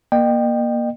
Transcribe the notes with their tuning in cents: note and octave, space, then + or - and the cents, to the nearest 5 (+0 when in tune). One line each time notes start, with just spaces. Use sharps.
A#3 +20 D#5 -40 G5 +0